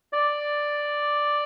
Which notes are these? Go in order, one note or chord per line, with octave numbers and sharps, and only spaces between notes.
D5